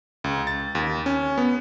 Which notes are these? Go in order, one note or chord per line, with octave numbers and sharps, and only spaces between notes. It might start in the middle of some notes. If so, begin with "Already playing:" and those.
C#2
A6
D#2
C#4
B3